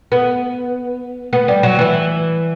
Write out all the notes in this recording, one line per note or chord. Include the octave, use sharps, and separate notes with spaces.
B3
B3
G3
F#3
E3